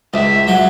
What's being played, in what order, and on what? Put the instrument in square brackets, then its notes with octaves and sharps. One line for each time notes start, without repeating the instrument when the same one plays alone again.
[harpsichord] C#2 [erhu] E5
[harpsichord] F#3